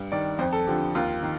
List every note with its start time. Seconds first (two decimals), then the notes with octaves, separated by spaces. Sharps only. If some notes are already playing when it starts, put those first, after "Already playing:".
Already playing: G2
0.12 D#3 D5
0.39 F2 C5
0.53 A4
0.67 D3 F3 G4
0.95 D#2 F4
1.23 D#3